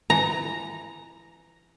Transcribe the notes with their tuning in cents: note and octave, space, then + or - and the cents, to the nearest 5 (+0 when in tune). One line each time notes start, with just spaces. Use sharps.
E3 +20 A#5 +0